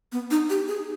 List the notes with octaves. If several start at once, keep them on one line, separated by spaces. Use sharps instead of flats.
B3
D#4
G4
G#4